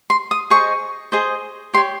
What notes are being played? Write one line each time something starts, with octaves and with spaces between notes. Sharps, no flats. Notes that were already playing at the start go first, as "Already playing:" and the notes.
C6
D#6
G#4 C5 D#5 C#6
G#4 C5 D#5
G4 C#5 C6